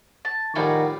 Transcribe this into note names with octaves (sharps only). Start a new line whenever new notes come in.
A5
A2 D#3 F3 G3 D#4 F#4 G#5